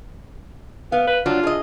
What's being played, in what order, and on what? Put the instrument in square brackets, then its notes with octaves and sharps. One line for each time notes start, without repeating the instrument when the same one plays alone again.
[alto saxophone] B3 [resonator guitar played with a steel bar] F5
[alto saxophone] B4
[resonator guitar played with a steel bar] F#3 D4 [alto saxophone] F4
[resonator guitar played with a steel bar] G#4 D#5